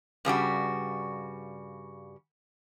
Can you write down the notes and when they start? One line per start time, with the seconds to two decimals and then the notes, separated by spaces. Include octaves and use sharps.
0.25 G2 C#3 G3 F#4